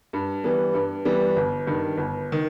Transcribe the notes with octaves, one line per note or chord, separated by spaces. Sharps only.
G2
E3 G3 B3
G2
E3 G3 B3
G1
G2 D#3
G1
D#3